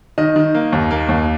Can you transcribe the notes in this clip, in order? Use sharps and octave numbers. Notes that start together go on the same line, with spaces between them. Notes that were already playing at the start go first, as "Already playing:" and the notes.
D#3 D#5
D#3
A#3
D#2
A#3
D#2